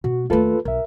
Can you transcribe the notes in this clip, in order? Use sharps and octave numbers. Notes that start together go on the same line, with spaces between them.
B2 F#4
D#2 A3 F4 A4 B4
B1 A#4 E5